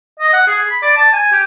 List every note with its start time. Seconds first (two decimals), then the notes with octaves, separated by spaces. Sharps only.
0.20 D#5
0.34 F#5
0.47 G#4
0.70 B5
0.82 D5
0.97 A5
1.13 G#5
1.32 G4